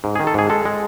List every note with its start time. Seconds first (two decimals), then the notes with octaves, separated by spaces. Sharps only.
0.04 G#2
0.16 G#4
0.20 D#3
0.27 A4
0.34 G#2 G#4
0.50 G#3 A4
0.65 G#3